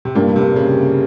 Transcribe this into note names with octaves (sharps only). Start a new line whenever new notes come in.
C3
G2 A#2 G3 A#3
C3
C#3